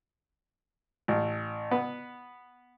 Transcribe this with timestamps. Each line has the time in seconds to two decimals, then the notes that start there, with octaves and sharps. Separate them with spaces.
1.08 A1
1.71 B3